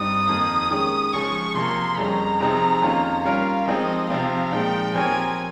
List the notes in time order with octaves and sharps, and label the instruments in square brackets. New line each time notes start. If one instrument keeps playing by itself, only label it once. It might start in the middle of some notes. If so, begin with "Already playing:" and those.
Already playing: [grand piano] G2 G3 C4 D#4 [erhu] D#6
[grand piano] F2 D#3 A#3
D#3 G#3 C#4 G4
[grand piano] C#3 F3 G#3 C#4 G#4 [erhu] C#6
[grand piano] C3 F3 A#3 [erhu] C6
[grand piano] F2 C#3 G3 C#4 [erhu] A#5
[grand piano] C3 F3 C4 D#4 G#4
F2 D#3 A#3 C#4 F4
[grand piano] G3 C#4 F4 A#4 [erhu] F5
[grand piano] F3 G#3 C4 D#4 G#4 [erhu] D#5
[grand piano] C3 F3 C4 [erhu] F5
[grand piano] A#2 F3 G#3 D#4 [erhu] G5
[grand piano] F3 C4 G4 A#4 C#5 [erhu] G#5